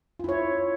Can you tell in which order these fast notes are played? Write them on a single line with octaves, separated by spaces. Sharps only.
F4 E4 C#5